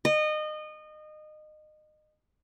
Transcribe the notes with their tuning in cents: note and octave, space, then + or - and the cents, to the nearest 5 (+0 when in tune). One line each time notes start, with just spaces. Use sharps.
D#5 -25